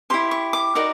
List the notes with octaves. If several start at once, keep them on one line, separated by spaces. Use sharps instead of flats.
E4 G4 C5 C6
C#6
D6
D#4 F#4 A#4 D5